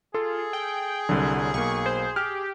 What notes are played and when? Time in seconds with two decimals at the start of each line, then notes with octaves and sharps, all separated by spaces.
0.14 F4 G#4 A4
0.53 G5
1.09 C2 D3 F#3
1.54 B1 A#3 C#6
1.86 C5
2.16 G4 F6